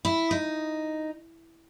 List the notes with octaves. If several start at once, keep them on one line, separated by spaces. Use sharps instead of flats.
E4
D#4